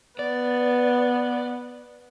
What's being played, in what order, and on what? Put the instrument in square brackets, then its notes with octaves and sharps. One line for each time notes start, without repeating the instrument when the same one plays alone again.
[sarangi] B3 [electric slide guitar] D5